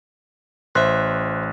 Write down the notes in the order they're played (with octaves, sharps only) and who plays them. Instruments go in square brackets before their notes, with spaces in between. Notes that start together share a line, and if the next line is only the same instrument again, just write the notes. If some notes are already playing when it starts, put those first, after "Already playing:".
[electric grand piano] A1 F#6 [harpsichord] C5 E5